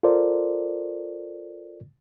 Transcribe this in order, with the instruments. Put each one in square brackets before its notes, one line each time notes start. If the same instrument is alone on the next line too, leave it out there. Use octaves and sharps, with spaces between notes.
[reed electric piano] F4 A4 A#4 C5 D5